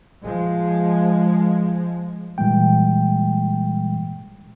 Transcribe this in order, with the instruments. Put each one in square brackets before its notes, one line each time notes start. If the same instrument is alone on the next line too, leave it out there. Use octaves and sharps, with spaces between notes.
[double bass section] F3 G#3
[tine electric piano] A#2 E3 G3 G#3 G5